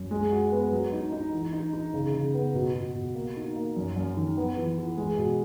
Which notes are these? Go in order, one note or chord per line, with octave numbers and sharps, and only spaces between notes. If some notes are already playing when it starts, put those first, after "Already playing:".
Already playing: F#2
G#3
F#4
B3
F#3
D#4
D#4
E3
D#4
D#4
C#3
C#3
B3
B2
B2
B2
A#3
D#4
A#3
F#2
F#2
D#3
B3
E3
E3
G#3
B2